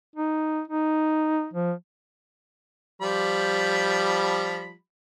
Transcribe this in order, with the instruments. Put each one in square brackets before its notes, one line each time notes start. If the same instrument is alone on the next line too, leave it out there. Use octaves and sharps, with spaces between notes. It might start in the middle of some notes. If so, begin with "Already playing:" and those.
[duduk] D#4
D#4
F3
[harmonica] F3 G3 B5